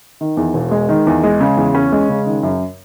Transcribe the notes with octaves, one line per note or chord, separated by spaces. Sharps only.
D#3
E2
E1
G#3
D#3
E2
G#3
C#3
E2
C#4
G#3
C#3
D#3
F#2